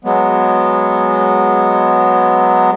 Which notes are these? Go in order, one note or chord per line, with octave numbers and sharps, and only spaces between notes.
F#3 G#3 B3